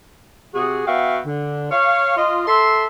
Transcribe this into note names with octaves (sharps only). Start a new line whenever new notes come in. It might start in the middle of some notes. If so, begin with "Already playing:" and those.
C3 F#4 G#4
B3 F#4 E5 F5 G5
D3
C#5 F5
F4 D#5
A4 E5 C6